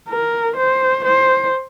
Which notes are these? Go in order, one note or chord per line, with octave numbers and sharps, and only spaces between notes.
A#4
C5
C5